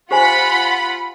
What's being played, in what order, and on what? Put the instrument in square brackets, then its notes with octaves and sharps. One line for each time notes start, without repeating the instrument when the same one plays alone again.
[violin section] F4 F#5 B5 [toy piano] G4 C5 G#5